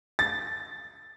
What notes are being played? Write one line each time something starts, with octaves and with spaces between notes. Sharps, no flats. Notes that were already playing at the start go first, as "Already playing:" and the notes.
A6